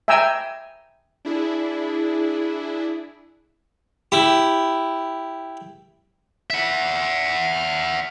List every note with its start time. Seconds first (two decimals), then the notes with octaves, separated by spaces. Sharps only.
0.08 E5 G5 G#5 A#5 E6
1.25 D4 E4 G#4
4.12 E4 G4
6.50 E5 F#5